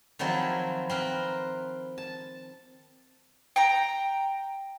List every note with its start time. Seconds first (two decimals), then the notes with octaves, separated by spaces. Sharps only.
0.19 D#3 F3 F#3 C4 E4
0.89 C4 A#4 B4
1.98 A5
3.56 G5 A#5